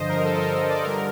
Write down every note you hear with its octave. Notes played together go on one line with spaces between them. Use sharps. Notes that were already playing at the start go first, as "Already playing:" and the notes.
Already playing: G2 D3 F3 C5 D#5
A#4
A4
A#4
D5
G2 D3 G3 A#4